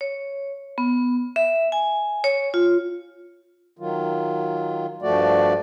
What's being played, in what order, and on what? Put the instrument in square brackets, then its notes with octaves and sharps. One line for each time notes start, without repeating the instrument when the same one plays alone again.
[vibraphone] C#5
B3
E5
G#5
C#5
F4
[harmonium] D#3 F#3 F4
G2 F3 A3 F#4 D5